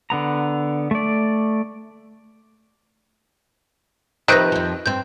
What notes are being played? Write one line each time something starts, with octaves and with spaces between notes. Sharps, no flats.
D3 B3 A#5
A3 D5
C3 D#3 F3 B4 F#6 G6 A#6
F2 F3
G2 C4 G6